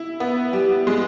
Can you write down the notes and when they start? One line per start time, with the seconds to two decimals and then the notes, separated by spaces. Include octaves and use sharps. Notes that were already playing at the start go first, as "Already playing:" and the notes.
Already playing: E4
0.20 B3
0.53 G3
0.87 G#3